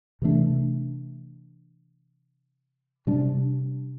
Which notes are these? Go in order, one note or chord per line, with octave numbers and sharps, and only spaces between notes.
C3 E3 A3 D4
C3 G3 D4